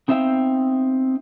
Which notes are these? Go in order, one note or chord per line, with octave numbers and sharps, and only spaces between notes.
B3 C4 D#4 E5 F5 G5